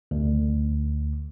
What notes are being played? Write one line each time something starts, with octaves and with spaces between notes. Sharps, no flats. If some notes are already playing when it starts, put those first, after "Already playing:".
D2